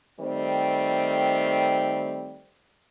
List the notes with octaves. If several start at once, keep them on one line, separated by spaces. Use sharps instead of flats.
D#3 G3 A3 C4